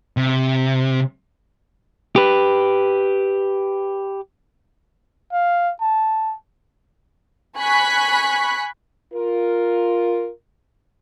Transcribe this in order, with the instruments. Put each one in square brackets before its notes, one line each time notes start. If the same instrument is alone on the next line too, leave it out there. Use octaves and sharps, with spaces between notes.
[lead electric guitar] C3
G4 B4
[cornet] F5
A5
[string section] G#5 B5 C#6 F#6 B6
[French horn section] F4 A#4